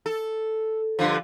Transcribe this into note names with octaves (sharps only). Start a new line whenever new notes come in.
A4
G2 D3 F3